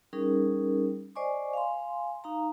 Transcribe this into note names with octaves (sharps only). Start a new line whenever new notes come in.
G3 C#4 D#4 G#4 A#4
C5 D5 D#5 G#5 C#6 D6
F5 G#5 C6
D#4 F5 A#5